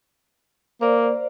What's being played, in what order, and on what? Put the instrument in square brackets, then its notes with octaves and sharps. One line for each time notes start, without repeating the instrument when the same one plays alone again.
[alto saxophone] A#3 [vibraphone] C5 D5